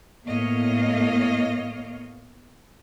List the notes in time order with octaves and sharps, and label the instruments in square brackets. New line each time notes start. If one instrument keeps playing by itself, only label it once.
[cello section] A2 A#3 B3 C#5 D#5 F5